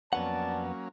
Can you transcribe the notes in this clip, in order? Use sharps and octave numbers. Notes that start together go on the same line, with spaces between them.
F2 F#3 A#3 B3 C#4 D5 F#5 A5